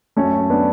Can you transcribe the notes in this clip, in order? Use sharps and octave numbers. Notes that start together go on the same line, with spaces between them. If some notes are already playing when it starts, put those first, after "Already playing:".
F#2 A3 C#4
F#2
B3 D4